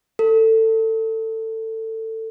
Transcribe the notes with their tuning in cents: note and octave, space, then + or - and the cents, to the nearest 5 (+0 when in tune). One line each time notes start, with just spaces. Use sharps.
A4 +20